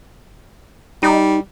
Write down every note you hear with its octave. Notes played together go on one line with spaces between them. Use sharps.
G3 D#4